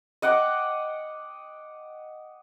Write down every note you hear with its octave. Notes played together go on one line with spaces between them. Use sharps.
D#5 F#5 G5 D6